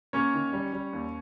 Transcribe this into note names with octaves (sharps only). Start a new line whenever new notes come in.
A#3 C#4 C#5
D#3
G3
G3
D#2